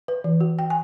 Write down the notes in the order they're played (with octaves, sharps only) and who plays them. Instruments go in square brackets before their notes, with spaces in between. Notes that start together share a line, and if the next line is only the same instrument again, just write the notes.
[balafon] B4
E3
F#4
G5
G#5